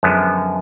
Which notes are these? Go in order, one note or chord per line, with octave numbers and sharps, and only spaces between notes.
F#2 D3 F3 G#3 B3